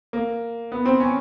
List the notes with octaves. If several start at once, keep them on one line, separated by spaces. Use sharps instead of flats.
A#3
B3
C4
C#4